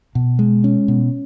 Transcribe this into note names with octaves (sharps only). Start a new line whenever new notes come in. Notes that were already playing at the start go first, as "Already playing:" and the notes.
B2
G#3
C#4
B2